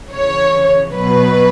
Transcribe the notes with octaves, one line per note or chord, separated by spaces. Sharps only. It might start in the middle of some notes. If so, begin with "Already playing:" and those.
C#3 E3 C#5
B2 F#3 B4